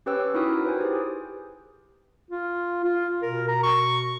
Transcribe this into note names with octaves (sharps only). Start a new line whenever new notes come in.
C#4 G4 B4 C#5 G5 E6
D#4 E4 F#4 A#4 G5 D#6
B4 C5 G#5
G4 G#4
F4
F4
B2 A#4
A#5
C#6